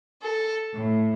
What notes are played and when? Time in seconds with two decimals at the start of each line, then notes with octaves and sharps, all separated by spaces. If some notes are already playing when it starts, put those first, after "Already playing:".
0.22 A4
0.73 A2